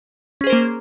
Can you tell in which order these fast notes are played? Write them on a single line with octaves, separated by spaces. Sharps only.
C#4 G#4 C5 A#4 A#3